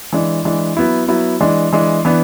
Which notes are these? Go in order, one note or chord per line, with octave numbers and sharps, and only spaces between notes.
E3 G#3 D4
E3 G#3 D4
F#3 B3 E4
F#3 B3 E4
E3 G#3 D4
E3 G#3 D4
E3 B3 D4